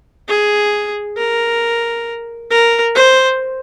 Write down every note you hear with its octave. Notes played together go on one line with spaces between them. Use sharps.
G#4
A#4
A#4
C5